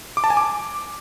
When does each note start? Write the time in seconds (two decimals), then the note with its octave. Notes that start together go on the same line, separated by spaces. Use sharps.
0.17 D6
0.24 A5
0.30 G#5
0.37 D6